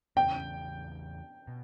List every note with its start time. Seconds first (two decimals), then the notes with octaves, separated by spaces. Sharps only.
0.16 E2 C#3 E3 G5
1.47 B2